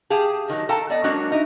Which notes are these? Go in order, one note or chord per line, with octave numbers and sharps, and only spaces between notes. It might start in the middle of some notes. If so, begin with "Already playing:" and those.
G4 G#4 F5 G5 A5
A#2 D#3 F#3
A4 F5 G5 A5 A#5
B3 D5 D#5
F#3 G#3 A#3 C#4 D4 F#4
D#4 E4